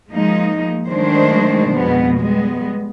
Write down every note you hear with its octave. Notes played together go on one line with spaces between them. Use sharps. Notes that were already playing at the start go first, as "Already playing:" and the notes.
F3 G#3 A#3 D#4
D#3 F#3 G#3 A3 D4 C5
F2 B2 G#3 B3
G3 G#3 B3